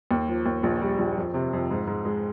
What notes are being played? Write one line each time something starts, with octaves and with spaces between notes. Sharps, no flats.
D#2
F3
D#2
A#1
G3
A#1
F2
C3
F2
G#2
G#2
G#3